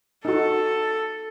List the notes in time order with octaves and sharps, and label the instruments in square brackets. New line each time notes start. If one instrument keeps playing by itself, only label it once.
[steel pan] D#4 F#4 [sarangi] A4